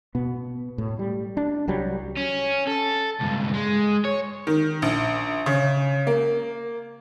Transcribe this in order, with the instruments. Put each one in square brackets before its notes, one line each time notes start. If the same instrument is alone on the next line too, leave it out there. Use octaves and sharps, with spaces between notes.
[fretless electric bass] B2 B3
A2
G3
D4
C2 F#3 G3
[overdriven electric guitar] C#4
A4
C#2 G2
G#3
C#5
[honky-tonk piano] D#3
A#1
C#3
A#3